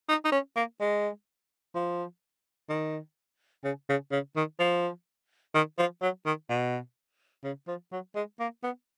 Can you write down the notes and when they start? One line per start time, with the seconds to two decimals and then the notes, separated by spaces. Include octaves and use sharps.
0.09 D#4
0.25 D#4
0.32 C#4
0.56 A#3
0.80 G#3
1.75 F3
2.69 D#3
3.64 C#3
3.89 C#3
4.12 C#3
4.36 D#3
4.59 F3
5.54 D#3
5.78 F3
6.02 F#3
6.26 D#3
6.49 B2
7.44 C#3
7.68 F3
7.92 F#3
8.15 G#3
8.40 A#3
8.63 B3